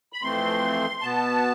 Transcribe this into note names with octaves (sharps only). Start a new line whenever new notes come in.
B5
F2 E3 A3 C4 C6
B2 B3 A5